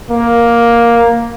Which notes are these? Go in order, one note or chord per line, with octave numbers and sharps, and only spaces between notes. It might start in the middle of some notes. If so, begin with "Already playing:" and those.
A#3